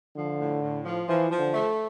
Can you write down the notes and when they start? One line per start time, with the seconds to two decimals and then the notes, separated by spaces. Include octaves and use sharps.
0.16 D3 F3
0.39 A2
0.62 A2
0.85 F3
1.08 E3 F3
1.31 F3
1.38 D3
1.54 A3